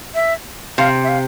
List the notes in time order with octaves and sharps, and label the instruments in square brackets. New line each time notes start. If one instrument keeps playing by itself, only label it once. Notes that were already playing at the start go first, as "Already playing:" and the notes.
[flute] E5
[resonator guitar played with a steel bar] C3 [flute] F5
[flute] E5
F5